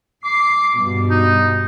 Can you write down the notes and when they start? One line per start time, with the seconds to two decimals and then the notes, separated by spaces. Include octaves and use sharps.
0.24 D6 C7
0.75 G2 B2
1.10 D#4